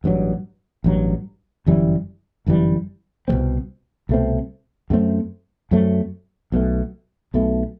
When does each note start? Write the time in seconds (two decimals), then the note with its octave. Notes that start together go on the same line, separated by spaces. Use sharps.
0.04 A1 G2 F#3
0.84 A1 G2 F#3
1.66 G1 F#2 E3 G3
2.46 G1 F#2 E3 G3
3.28 C2 B2 A3 C4
4.09 C2 B2 A3 C4
4.90 F#2 F#3 A3 C4
5.71 F#2 F#3 A3 C4
6.52 B1 B2 A3
7.34 B1 B2 A3